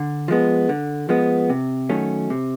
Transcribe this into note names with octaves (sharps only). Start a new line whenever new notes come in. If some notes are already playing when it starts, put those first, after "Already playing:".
Already playing: D3
F3 G#3 B3
D3
F3 G#3 B3
C3
D#3 F#3 A3 C#4
C3